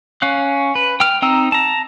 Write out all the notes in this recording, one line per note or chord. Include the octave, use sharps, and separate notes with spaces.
C#4 F5 F#6
B4
G5 F6
C4 D#4 G5 A#5 E6
A5 A#5